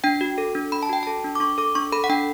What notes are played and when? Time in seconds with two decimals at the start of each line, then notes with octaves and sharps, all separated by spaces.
0.04 D4 G5
0.21 F#4
0.38 A4
0.55 D4
0.72 D4 B5
0.83 A5
0.89 F#4 G5
1.03 A4 A5
1.24 D4
1.35 D6
1.40 D4 C#6
1.58 A4 D6
1.75 D4 C#6
1.92 A4 B5
2.04 F#5
2.10 D4 G5